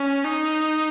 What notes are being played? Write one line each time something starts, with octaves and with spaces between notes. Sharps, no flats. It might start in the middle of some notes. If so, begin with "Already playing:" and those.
Already playing: C#4
D#4